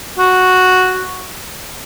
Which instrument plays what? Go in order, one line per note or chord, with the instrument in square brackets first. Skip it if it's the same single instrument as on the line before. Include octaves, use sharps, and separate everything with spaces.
[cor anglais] F#4